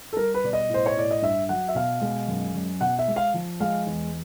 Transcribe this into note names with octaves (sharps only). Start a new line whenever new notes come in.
A4
G3 A#4
B4
B2 D5
D#5
A2 C5
C#5
A2 D5
D#5
G2 E5
F#3 F#5
E5
B2 F5
G#3
F#2
F#2
B2 F#5
E5
G#3
F5
F3
G#3 F5
E2